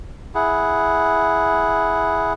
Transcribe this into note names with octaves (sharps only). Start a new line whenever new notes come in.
E4 G#4 F#5